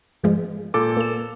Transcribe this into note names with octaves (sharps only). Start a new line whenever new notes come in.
G#2 F3 G#3
A#2 A4 D6
A#3 E7